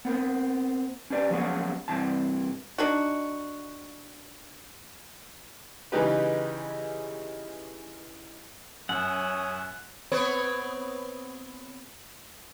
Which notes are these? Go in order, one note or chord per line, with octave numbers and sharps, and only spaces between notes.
B3 C4 A#4
C#4 G4 B4 D5
F3 F#3 G#3 A#3 B3 C#4
G2 C3 E3 A5
D4 D#4 F#4
C#3 E3 G#3 D#4 G4 B4
F#2 C#5 F#5 D#6
B3 C4 C#5